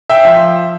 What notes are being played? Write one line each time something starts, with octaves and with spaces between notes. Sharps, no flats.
E5 G5
F3